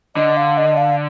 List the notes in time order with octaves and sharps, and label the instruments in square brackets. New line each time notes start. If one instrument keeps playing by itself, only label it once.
[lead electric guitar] D3 [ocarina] D#5
[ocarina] F5
D#5
F5